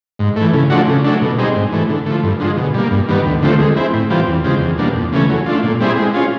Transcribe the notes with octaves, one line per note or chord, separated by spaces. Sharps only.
G#2
E3 A3
C#3
F3 A3 D4 F#4
C#3
F#3 A3 D4
B2
G3 C4 D#4 G#4
G#2
E3 A3
D3
F3 A3
G2
D3 F3 G#3
B2
G3 A#3
G2
D#3 G3 B3
D2
D3 F3 A3 C4
G#3
C4 E4
A2
E3 G3 C4 F4
E2
C#3 F3 G#3 C4
E2
B2 G3 A#3 D4
F2
C#3 E3 A3 C#4
F#3
A3 D4 F4
A#2
G3 C4 E4 G#4
G#3
C#4 F4